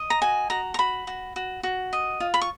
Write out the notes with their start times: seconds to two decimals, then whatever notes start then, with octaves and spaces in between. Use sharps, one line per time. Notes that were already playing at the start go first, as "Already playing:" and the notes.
Already playing: D#5
0.10 A#5
0.22 F#4 G#5
0.50 F#4 A#5
0.74 A#5
0.79 F#4 B5
1.07 F#4
1.36 F#4
1.63 F#4
1.93 D#5
2.20 F4
2.34 B5
2.42 C#6